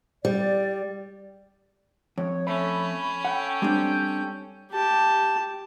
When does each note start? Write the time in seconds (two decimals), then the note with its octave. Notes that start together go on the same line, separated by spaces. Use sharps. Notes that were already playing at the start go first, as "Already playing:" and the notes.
0.25 G3 D5
2.18 F2 C#5
2.47 A3 C#4 B5
3.25 A4 F#5 G5
3.62 G3 C4 D4 G6
4.72 G4 A5